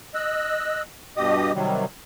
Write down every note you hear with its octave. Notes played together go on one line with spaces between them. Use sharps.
D#5 E6 F#6
G2 B2 G4 D#5 D#6
C3 D#3 F#3 G3